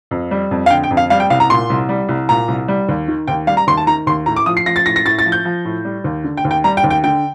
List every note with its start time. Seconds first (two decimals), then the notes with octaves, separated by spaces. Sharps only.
0.11 F2
0.31 G3
0.51 F2
0.66 F5
0.70 D3 G5
0.84 G5
0.91 F2
0.97 F5
1.10 G3 F5
1.20 G5
1.30 C2 F5
1.40 A#5
1.50 A#2 C6
1.70 C2
1.89 G3
2.09 C2
2.29 A#2 A#5
2.48 C2
2.68 G3
2.89 D#2
3.08 D#3
3.28 D#2 G5
3.47 G3 F5
3.57 A#5
3.67 D#2 C6
3.77 A5
3.87 D#3 A#5
4.07 D#2 C6
4.26 A2 A#5
4.36 D6
4.46 F3 D#6
4.57 C7
4.66 F3 A#6
4.76 A6
4.86 A2 A#6
4.96 A#6
5.06 A2 A6
5.19 A6
5.26 F3
5.32 G6
5.45 F3
5.65 A2
5.85 G3
6.04 D#2
6.24 D3
6.37 G5
6.45 D#2
6.51 G5
6.64 G3 A#5
6.77 G5
6.84 D#2
6.90 G5
7.04 D3 G5